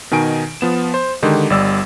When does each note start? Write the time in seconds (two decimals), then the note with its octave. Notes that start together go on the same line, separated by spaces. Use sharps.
0.11 B2 D#3 D#4 G#5 D7
0.61 F3 B3 E7
0.94 C5
1.23 D3 D#3 G#3 G4
1.50 G1 G3 D5 E6